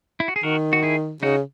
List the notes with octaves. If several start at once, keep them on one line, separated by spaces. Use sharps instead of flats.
E4
F#4
G#4
D#3 F#4 A#4
F#4
E4 G#4
C#3 D#4 F#4